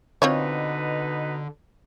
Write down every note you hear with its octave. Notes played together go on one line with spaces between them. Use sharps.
B2 D3 C4 D#4 F4 B4 C#5